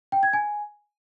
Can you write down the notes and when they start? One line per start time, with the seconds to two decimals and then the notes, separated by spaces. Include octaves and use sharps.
0.12 G5
0.23 G#6
0.33 G#5